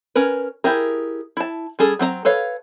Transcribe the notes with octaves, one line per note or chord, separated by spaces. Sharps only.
C#4 A#4 B4
E4 G4 G#4 A#4
E4 A5
G3 C#4 G#4 A4
F#3 C4 G#4 A#5
A4 B4 C#5 F5